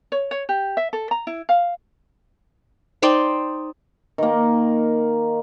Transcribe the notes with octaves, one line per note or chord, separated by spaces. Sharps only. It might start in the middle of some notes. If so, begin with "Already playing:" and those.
C#5
C#5
G4
E5
A4
A#5
E4
F5
D#4 C5 D5 G5
D#3 A#3